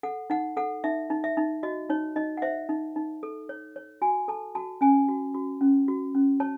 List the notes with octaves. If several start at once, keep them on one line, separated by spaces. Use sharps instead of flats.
A4 F#5
D#4 F#5
A4 F#5
D#4 E5
D#4
E5
D#4
F#4 D#5
D#4 C#5
D#4 D#5
F#5
C5 E5
D#4
D#4
A4
C#5
C#5
F#4 G#5
A4 A5
F#4 A5
C#4 G#5
F#4
F#4
C#4
F#4
C#4
C#5 A5